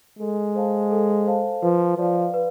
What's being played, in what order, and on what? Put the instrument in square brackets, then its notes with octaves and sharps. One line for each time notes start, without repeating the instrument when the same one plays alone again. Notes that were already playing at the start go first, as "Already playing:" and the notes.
[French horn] G#3 [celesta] A4
[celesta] C5 F5 A5
A4
C5 F5 A5
[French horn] F3 [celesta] B4
[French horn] F3 [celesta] D5 F5
[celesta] B4